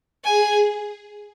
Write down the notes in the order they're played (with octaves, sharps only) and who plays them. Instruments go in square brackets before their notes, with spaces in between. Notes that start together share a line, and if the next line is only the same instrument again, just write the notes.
[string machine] G#4 [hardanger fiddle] G#5